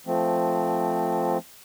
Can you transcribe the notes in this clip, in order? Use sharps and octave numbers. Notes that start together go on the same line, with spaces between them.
F3 A3 C4